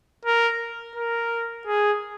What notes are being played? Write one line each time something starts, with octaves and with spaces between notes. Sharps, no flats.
A#4
A#4
G#4